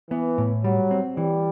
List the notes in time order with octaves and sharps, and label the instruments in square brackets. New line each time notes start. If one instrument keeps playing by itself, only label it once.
[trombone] E3 [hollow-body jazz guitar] B3
[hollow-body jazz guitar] A2
[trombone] F#3 [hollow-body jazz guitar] G3
[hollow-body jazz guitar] C4
[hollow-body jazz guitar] E3 [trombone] G3